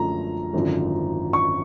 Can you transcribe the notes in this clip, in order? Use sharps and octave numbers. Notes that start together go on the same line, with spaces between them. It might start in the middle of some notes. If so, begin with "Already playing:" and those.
Already playing: F#2 D3 F3 A3 A#5
G#1 F#2 D3 F3
C#6